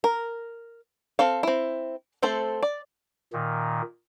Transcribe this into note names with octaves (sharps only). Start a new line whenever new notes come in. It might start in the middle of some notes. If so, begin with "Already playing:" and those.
A#4
C4 A4 F5
C4 E4
A3 C4 A4 C5
D5
A#2 D#3